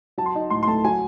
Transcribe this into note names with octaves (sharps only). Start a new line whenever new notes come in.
F#3 A5
C6
D#4
A2 C6
C6
A3 A5
F#3 G#5